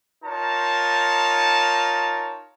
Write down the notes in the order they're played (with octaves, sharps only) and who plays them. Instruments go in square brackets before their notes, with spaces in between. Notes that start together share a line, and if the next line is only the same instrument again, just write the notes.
[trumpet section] D#4 F4 A#4 C#5 A5